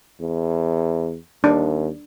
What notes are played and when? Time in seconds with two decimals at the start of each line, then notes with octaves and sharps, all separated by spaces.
0.21 E2
1.44 D#2 D4